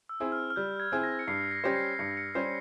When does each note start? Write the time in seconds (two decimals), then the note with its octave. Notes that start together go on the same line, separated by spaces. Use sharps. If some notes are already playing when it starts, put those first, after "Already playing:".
0.09 E6
0.20 C4 E4 G#4
0.32 F6
0.50 F6
0.56 G3 G6
0.80 G#6
0.92 C4 E4 G#4
1.03 A#6
1.19 C#7
1.28 G2 C7
1.51 A#6
1.64 G3 C#4 G4 C5 A#6
1.76 C7
1.99 G2 C#7
2.17 C#7
2.34 G3 C#4 G4 C5 C7